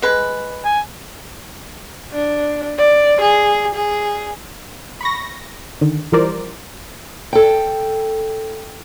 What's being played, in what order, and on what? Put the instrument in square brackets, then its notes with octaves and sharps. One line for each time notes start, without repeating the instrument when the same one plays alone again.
[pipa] G#3 B4
[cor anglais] G#5
[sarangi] D4
D5
G#4
G#4
[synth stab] B5 C#6 A#6
D3 D#3
E3 F3 G3 A#4 C5 D5
[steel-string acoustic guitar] A4 G5